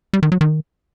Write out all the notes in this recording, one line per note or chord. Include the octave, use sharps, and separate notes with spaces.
G3
D#3
F#3
D#3